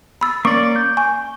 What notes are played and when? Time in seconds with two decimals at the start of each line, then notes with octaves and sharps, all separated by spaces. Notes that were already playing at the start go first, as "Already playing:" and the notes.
0.21 B5 E6 A6
0.45 A#3 C#4 D5 C#6 D6
0.76 G6
0.97 G#5 C#6